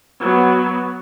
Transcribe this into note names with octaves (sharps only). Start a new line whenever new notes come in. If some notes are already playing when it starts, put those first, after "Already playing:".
F#3 B3